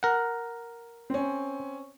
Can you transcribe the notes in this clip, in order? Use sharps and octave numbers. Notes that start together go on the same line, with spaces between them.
A#4 F#5
C4 C#4